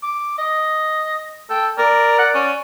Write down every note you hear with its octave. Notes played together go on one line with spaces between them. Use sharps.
D6
D#5
A4 G5
A#4 D5
F#5
C#4